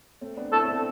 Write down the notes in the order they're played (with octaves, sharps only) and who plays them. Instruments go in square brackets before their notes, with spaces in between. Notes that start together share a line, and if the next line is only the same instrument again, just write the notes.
[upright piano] A3 C4
B3 D4
[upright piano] C4 E4 [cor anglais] A4
[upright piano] C4
B3 D4